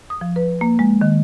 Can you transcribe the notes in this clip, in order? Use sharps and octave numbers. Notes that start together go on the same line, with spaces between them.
D#6
F3
B4
A#3
G#3
D#3